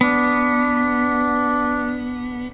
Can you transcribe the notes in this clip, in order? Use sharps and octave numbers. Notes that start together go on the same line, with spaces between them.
B3 D4